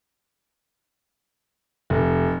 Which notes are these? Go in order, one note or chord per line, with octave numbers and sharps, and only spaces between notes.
F1